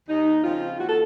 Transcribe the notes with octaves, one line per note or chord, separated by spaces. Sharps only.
D#2 D#4
C#3 F3 C4 F4
D#2 F#4
A4